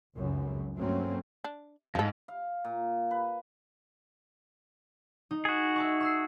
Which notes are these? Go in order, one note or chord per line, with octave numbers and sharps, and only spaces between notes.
F1 C#2 F#2 C#3
G2 F#3 A3 A#3 C4 C#4
D4
F2 G#2 F3 A4
F5
A#2
B4
D#4
F#4 G#4
E5 A5 C#6
C#6 E6 C7